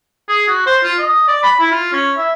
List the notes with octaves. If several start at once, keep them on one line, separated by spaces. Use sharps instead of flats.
G#4
F#4
C5
F4
D#5
D5
B5
E4
F4
C#4
E5